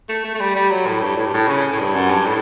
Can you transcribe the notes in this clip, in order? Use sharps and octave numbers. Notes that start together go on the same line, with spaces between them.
A3
A3
A3
G3
G3
F#3
A2
G2
A2
G2
A2
C#3
A2
G2
F#2
G2
A2